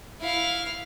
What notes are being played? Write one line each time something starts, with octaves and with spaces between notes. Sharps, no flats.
E4 F5